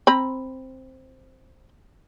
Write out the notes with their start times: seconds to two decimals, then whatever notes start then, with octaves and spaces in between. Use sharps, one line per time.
0.07 C4 A#5 B5